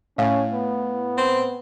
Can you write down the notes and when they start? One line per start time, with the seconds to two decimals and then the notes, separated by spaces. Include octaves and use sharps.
0.18 A2 C#4 F5
0.53 B3
1.18 C4